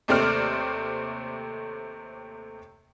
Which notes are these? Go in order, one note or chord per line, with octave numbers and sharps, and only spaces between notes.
D#2 C3 A3 C4 D5 F6